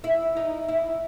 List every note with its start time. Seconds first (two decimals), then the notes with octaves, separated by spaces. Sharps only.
0.04 E4
0.37 D#4
0.68 E4